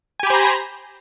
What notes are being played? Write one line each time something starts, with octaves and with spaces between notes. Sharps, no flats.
G4 C5 G#5 A#5 B5